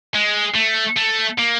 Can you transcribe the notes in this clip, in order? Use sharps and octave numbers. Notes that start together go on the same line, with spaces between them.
G#3
A3
A3
A#3